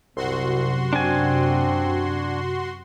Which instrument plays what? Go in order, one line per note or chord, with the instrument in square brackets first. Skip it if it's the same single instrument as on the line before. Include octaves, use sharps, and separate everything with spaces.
[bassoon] C2 [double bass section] F#2 C3 [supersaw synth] F#4 C6
[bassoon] C4 [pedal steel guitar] D4 G#5